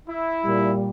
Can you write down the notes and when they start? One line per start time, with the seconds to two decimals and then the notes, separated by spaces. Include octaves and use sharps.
0.08 E4
0.43 A#2 G3